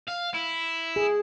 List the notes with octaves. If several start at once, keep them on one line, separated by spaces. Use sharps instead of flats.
F5
E4
G#4